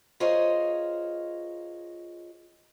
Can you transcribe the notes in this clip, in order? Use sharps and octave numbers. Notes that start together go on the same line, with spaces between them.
F4 G#4 A#4 C5 C#5 D#5